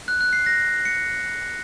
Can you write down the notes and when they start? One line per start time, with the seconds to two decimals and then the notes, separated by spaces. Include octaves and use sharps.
0.08 F#6
0.21 F#6
0.33 C7
0.46 A#6
0.85 C#7